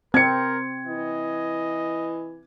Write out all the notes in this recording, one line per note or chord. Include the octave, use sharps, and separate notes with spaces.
C4 A#4 G#6 C#7
E3 D#5